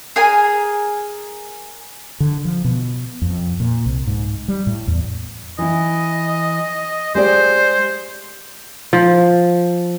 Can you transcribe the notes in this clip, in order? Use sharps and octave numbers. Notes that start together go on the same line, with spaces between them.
G#4 A#4 G#5
D3
F3
B2
F2
A#2
C2
G#2
G3
A2
E2
E3 E4 D#5
G#3 G4 C5 D5
F3